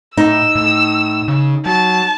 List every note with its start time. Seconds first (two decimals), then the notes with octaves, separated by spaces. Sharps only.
0.17 A2 D#4 E6
0.55 A2
1.28 C#3
1.66 F#3 A5